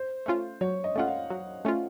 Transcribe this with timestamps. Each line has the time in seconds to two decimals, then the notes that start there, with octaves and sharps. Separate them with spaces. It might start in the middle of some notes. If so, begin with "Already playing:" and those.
Already playing: C5
0.26 A3 C#4 F4
0.61 F#3 C#5
0.84 D#5
0.96 A3 C#4 F4 F#5
1.08 F5
1.30 F#3
1.65 A3 C#4 F4